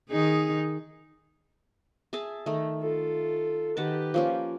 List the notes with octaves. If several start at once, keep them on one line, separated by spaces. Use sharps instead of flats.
D#3 D#4 G#4
G#4 E5 A5
D#3 A3
F4 A4
D#3 G4 B4 F#5 A5
F3 A#3 C#4